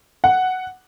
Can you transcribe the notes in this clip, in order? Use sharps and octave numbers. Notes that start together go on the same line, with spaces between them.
F#5